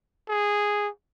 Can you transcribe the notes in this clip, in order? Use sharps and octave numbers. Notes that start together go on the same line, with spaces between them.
G#4